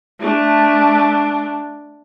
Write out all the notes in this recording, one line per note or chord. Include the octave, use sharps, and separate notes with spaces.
A3 D4